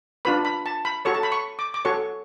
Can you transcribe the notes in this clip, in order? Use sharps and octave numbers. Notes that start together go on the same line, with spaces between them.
D4 F4 B4 B5
B5
A5
B5
F#4 A4 C#5 C#6
A5
B5
C#6
D6
D6
F#4 A4 C#5 C#6